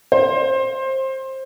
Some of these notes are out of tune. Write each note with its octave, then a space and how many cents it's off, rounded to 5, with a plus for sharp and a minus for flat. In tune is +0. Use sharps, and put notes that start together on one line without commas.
C5 +20